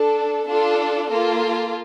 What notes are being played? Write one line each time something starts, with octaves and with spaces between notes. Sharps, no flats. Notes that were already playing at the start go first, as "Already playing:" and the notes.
Already playing: D4 A4
D4 F4 A4
A#3 F4 A4